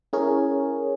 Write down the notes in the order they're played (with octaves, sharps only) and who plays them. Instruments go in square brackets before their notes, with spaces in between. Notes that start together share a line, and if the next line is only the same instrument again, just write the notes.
[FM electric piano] C#4 E4 G#4 A#4 C#5